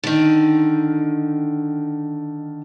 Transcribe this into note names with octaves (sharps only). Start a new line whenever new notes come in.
D3 D#3